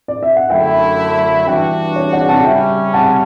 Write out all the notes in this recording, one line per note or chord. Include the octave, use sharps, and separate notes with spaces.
D5
E5
F#5
F#2 D3 A3 E4 E5 G5
G2 E3 B3 D4 F#4 E5 G5
C#5
D5 F#5
F#5 A5
C#3 G3 C#4 E5 G5
F#5 A5